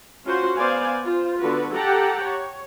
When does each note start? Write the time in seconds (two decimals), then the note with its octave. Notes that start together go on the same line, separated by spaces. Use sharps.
0.25 C#4 F4 F#4 C5
0.57 B3 C5 D5 F5 G#5
1.04 F4 C5
1.39 D3 B3 F#4 B4
1.73 G4 A4 F#5 G5 A5 A#5
2.22 C#5